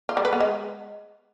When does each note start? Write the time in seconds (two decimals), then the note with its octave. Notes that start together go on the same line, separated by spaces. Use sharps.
0.09 F4
0.17 G3
0.25 B4
0.33 B3
0.40 G#3